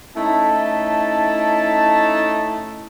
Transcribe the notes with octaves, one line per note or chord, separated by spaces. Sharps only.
A3 C#4 D#4 E4 A5